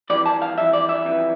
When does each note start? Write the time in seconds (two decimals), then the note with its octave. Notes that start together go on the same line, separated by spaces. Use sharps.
0.10 F2 E3 G3 D5
0.26 A5
0.42 F5
0.57 F2 E3 G3 E5
0.73 D5
0.89 E5
1.05 F2 E3 G3